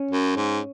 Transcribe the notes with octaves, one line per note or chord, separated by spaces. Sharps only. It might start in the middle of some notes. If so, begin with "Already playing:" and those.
Already playing: C#4
F#2
G#2